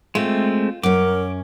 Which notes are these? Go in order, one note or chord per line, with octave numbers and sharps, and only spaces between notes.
G#3 A3 C4 F4
F#2 C#4 A#4 D6